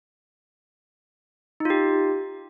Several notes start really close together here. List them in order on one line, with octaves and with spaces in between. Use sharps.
D#4 F4 G4